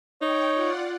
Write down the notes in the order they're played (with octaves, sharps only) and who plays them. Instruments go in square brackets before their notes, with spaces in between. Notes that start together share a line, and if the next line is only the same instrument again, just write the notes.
[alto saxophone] D#4 [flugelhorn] C#5 [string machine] G5
[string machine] F4 D5 F#5